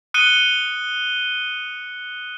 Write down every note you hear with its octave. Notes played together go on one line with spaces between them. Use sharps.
D#6 F#6 C#7 D#7 G7